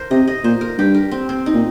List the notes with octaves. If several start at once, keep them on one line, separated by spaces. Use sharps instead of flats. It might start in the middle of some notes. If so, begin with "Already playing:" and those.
Already playing: A#4 C5
C3 D#5
D#5
A#2 C5
A#4
G2 G4
A#4
C4
C4
D#4
A#2